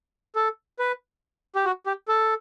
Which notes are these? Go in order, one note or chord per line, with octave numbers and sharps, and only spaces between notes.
A4
B4
G4
F#4
G4
A4